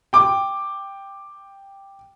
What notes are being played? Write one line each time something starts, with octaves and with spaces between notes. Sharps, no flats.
G5 D6